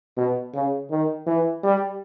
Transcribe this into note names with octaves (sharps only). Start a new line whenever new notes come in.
B2
C#3
D#3
E3
G3